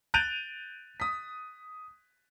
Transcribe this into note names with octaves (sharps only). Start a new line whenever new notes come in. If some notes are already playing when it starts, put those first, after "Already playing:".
F#6 G6 A6 D7 D#7 F7
D#6 B6